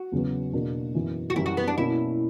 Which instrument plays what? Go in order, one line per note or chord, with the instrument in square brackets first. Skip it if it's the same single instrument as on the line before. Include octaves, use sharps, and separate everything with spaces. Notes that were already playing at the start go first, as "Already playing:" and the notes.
Already playing: [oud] F#4
[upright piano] E2 C#3 F#3 B3
E2 B2 A#3 D4
F#2 E3 B3
[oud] F#4
[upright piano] F#2 E3 G3 [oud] E4
[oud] F#4
B3
D4
[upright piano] B2 A#3 C#4 [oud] E4